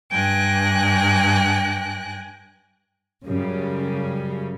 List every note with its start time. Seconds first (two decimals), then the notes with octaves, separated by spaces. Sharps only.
0.11 G2 G5 G#5 F#6 A#6
3.24 F#2 C#3 G3